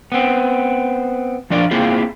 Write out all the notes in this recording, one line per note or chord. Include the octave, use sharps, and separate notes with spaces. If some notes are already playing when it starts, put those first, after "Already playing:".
B3 C4
F2 F3 D4 D5 F5
A#3 C4 E4 F4 G#4